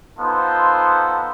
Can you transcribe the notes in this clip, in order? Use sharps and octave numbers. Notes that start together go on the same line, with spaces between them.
B3 D#4 F4 A4 C5